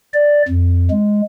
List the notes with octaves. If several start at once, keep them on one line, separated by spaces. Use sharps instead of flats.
D5
F2
G#3